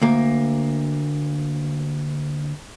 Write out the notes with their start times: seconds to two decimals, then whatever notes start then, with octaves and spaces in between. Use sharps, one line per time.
0.02 D2 A#3